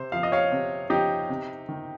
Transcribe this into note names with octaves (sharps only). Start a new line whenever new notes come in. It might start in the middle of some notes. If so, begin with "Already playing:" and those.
Already playing: C3 C5
F3 F5
D#5
C#5 F5
C3
F3 D#4 G4
C3
D#3